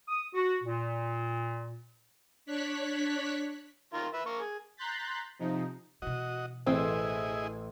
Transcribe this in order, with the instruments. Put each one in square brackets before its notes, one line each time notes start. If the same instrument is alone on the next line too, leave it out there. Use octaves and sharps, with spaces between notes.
[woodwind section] D#6
F#4
A#2
[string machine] D4 C#5 F#6 B6
[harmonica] D#3 F4 A#4
B4 E5
A#3 C#6
G#4
[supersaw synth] A#5 C6 F#6 G6 A6 B6
C3 F3 D#4
[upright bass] B2 E3 [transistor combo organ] F#4 D#5
[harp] A1 E6 [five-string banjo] C4 [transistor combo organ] E4 G#4 D#5